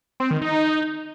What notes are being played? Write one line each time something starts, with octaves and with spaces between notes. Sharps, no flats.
C4
D#3
D#4